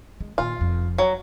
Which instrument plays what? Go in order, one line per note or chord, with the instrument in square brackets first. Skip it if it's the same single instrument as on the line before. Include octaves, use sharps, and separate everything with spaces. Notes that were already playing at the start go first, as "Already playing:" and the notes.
[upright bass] G#3
[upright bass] A#2 D#3 [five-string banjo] F4
[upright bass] F1 F2
[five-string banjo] F#3